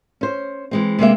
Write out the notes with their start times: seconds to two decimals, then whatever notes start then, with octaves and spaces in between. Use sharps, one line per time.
0.21 C#4 C5
0.71 E3 G#3 C4
0.99 C3 G#3 A#3 E5